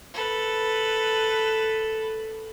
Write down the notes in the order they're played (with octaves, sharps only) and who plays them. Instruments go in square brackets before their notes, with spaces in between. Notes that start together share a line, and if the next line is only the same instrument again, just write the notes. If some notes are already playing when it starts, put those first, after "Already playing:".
[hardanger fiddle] A4 B4